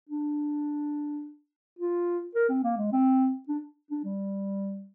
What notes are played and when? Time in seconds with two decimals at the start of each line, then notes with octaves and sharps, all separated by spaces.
0.09 D4
1.79 F4
2.35 A#4
2.49 C4
2.64 A#3
2.77 G#3
2.92 C4
3.48 D4
3.91 D4
4.04 G3